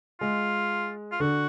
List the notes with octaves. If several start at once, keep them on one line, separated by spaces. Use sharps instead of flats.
G#3 F4
F4
D3 F#4